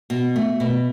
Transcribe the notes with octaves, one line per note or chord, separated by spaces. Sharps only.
B2
A3
B2